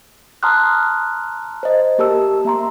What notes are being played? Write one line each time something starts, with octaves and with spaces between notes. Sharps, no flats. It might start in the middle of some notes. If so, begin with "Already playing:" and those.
A5 A#5 C6 D#6 F6 F#6
C5 D#5
A#3 G4 A#4 A5 E6
A#3 E5 A#5 C6